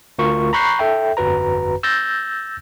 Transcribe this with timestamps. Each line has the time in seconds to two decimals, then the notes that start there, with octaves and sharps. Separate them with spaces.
0.19 D2 F4 A#4 C#6
0.53 A#5 B5 C#6 F#6 G6 C7
0.79 A4 E5 G5
1.17 G1 F2 F#4 B4 A#5
1.83 E6 G6 A6 A#6